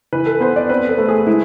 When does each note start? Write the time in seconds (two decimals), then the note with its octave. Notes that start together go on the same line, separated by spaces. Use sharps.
0.13 E3 B4
0.26 A4
0.41 B3 C5
0.56 D5
0.69 C4 B4
0.89 A4
0.98 A3
1.08 G#4
1.27 G#3 E4